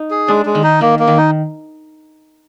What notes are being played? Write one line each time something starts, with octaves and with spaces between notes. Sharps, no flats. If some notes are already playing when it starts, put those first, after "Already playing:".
Already playing: D#4
G#4
G#3 D4
G#3
D#3
D#4
D#3 A#3
A#3
D#3
D#4